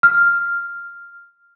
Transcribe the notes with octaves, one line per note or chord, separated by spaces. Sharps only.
F6